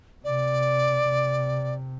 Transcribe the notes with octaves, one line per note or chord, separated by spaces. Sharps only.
C3 D5
C3